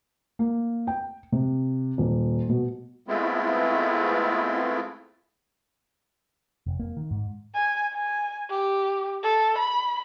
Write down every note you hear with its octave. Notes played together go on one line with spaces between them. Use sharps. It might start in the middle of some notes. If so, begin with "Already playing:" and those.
A#3
G5
C3
D#1
B2
G#3 A3 B3 C4 E4 F4
F1
A#3
D#3
G#2
G#5
G#5
G4
A4
B5